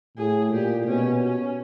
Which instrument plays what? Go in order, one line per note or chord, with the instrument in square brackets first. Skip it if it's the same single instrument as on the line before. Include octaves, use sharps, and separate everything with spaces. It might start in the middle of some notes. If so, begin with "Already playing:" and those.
[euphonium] A2 [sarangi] G#4
[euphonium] A#2 [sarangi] G4
[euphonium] B2 [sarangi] C#4
[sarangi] C#4